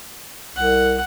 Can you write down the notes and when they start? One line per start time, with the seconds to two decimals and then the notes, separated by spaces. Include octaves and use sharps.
0.56 C2 F#5